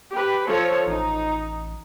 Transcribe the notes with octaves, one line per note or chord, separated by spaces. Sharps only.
G4 B4
F3 A4 C#5
A1 D#4